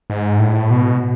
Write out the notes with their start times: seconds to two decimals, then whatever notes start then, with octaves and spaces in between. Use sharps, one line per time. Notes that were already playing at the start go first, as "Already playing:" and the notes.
0.10 G#2
0.39 A2
0.71 B2